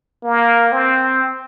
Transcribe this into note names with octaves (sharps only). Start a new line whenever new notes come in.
A#3
C4